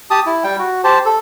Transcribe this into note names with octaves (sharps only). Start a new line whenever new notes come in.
G4 A5 D#6
E4
G3 G5
F#4
G4 C5 A5
A4